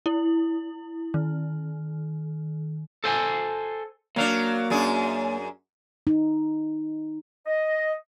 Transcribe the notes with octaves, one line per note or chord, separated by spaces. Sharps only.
E4
D#3
A4 C5 G#5
F#3 A#3 D4 F5
F#2 D4 G#4
D#4
D#5